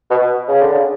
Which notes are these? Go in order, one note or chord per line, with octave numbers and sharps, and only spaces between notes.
B2
C#3
D3
C#3